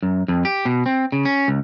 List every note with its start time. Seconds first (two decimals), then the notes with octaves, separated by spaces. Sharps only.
0.03 F#2
0.28 F2
0.45 G4
0.65 B2
0.86 C4
1.12 C#3
1.25 C#4
1.48 C#2